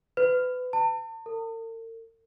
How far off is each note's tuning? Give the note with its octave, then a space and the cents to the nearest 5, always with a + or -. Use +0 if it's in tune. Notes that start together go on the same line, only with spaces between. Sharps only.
B4 +30
A5 +40
A#4 -45